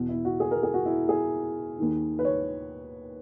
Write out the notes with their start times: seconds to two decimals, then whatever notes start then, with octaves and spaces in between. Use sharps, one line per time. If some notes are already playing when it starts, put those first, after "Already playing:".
Already playing: E2 B2
0.09 E4
0.25 F#4
0.40 G#4
0.51 A#4
0.63 G#4
0.74 F#4
0.86 E4
1.09 G#4
1.78 D#2 D#3
2.19 B4
2.25 C#5